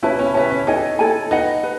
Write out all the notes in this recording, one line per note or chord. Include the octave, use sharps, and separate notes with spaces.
C#4 E4 B4 E5 A5
C#4
C#4 B4 E5 A5
C#4
D#4 E4 A4 C#5 G#5
E4 A4 C#5 G#5
D#4 B4 D#5 F#5
B4